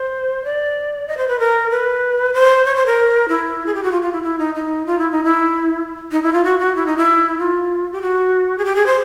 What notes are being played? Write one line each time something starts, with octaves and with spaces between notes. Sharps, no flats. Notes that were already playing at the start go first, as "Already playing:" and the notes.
Already playing: C5
D5
D#5
C5
B4
A#4
B4
C5
C#5
C5
A#4
E4
G#4
G4
F#4
F4
F4
E4
E4
D#4
D#4
F4
E4
D#4
E4
D#4
E4
F4
F#4
F#4
E4
D#4
E4
F4
G4
F#4
G#4
G4
G#4
C5